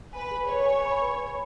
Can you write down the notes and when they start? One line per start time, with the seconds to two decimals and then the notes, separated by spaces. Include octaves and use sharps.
0.13 B4 G#5
0.31 G#4
0.48 B4 C#5
0.66 G#5
0.85 B5
1.02 B4
1.21 B5